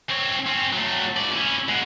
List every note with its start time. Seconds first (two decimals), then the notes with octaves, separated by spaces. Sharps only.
0.10 C4 C#5
0.46 C4 C#4
0.73 F#3 A3
1.16 G#2 D5
1.32 C#4 E4
1.68 G#3 F#4